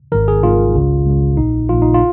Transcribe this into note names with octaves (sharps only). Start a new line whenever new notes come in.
G#1 G#2 D#3 A#4
G#4
G#1 G#2 D#3 F4
C#2 C#3
C#2 C#3
A#1 A#2 D#4
A#1 A#2 F4
D#4
F4